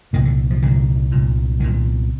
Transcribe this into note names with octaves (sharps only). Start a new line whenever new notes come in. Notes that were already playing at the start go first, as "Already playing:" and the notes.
C2 A#2 D#3
D3
F3
C2 A#2 D3
C2 A#2
C2 A#2 D#3